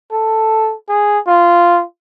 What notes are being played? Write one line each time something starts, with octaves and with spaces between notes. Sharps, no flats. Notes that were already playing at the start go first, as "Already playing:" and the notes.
A4
G#4
F4